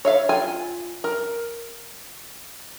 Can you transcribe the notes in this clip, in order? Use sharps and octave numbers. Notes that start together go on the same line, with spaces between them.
C#5 E5 F5
F4 G5 G#5
A#4